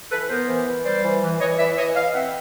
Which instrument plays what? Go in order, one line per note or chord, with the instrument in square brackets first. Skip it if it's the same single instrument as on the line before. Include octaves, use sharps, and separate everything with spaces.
[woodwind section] E3 A4 B4
B3 A#4 C5
E3
E3
G3 C5 D5
E3
E3
E3 C#5 D#5
E3 D5 E5
E3 C#5 D#5
E3 D#5 F5
C4 E5 F#5